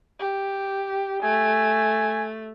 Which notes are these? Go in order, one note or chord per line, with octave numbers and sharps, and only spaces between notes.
G4
A3 G#5